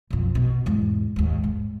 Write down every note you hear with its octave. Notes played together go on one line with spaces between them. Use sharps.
B1 F2
B2
E2 G#2
D#2 G#2
G#2